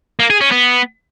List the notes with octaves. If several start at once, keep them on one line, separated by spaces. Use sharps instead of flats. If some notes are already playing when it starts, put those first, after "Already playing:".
A#3
G#4
C#4
B3